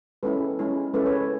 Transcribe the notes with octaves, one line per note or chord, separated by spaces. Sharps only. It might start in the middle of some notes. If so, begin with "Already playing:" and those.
G#3 C#4 E4 A4 B4
G#3 C#4 E4
G#3 C#4 E4 A4 B4
B4 C#5